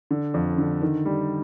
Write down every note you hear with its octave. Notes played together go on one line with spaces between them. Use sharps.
D3
F2
D3
D#3
G3